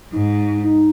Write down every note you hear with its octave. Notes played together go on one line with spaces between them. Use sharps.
G#2 D#4
D#4